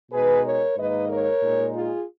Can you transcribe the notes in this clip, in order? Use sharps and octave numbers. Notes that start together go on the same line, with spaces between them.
B2 G#3 D#4 G#4 B4
A#4 C#5
G#2 D#3 A#3 D#4 B4 D#5
A#4 C#5
A#2 G#3 D#4
F4 G#4